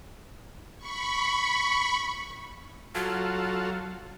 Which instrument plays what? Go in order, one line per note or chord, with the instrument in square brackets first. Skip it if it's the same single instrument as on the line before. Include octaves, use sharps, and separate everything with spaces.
[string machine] B5 C#6
[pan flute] F#3 [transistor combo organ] F4 F#4 A4